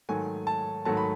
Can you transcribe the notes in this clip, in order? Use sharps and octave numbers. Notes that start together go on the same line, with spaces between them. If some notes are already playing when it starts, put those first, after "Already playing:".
G#2 D#3 F#3 A3 G#5
A5
G#2 D#3 F#3 A3 A5
B5